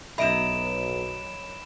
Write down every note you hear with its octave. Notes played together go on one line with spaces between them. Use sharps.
B1 F#2 D#5 E5 B5 D7 E7